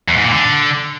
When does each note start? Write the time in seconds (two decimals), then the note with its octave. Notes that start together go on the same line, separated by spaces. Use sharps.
0.08 E2
0.16 G#2
0.24 A#2
0.32 D3